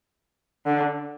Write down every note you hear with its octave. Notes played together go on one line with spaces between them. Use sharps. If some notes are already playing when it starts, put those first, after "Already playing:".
D3